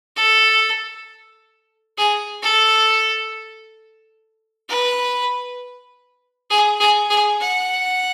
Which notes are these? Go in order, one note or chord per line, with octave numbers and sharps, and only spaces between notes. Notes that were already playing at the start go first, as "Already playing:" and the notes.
A4
G#4
A4
B4
G#4
G#4
G#4
F#5